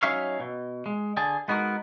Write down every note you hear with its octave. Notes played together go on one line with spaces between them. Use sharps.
F#3 C#4 D#4 C#5 E5 F5
B2
G#3
D3 G#4 A5
G#3 B3 D#4 F#4 A#4